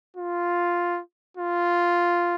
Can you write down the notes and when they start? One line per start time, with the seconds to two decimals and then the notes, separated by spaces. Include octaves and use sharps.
0.17 F4
1.37 F4